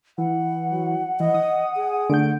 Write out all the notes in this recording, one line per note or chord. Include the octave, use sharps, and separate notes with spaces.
E3 F#5
F#3
E3 D#5
D#6
G#4
D3 A3 G6 D7